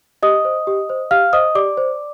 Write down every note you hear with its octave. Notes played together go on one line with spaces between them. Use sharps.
G4 D#5 D#6
C5
G4
C5
G4 F5 F6
C5 D#5 D#6
G4 D5 D6
C5